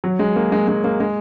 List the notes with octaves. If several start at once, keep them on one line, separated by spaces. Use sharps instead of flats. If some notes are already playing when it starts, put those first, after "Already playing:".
F#3
G#3
A#3
G#3
G#3
A#3
G#3